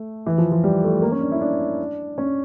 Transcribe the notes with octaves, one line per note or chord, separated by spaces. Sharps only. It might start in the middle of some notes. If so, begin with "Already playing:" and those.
Already playing: A3
E3
F3
F3
G3
A3
A#3
C#4
D4
E4
D4
C#4